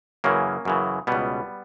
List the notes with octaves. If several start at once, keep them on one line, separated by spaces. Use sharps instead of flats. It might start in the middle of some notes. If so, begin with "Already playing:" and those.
F#2 C#3 E3 A#3 C#4
F#2 C#3 E3
C#2 B2 G3 B3